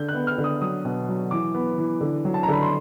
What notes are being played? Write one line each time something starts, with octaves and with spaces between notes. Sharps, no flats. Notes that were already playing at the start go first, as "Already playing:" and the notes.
Already playing: D3 G6
F#6
B3
F6
D3
D#6
F#3 D#6
B2
F#3
E3 D6
B3
E3
D3
F#3
A5
A#5
D3 B5
C6